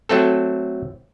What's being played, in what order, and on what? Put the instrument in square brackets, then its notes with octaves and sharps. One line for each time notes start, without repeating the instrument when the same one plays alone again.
[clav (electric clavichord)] F#3 A3 C4 A4